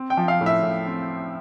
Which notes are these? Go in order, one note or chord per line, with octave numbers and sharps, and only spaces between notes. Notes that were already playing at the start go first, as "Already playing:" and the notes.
Already playing: C4
G5
F3
F5
A2
E5
A2
C4